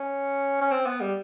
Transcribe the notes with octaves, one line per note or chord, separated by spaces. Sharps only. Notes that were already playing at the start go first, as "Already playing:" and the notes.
Already playing: C#4
C#4
C4
B3
G3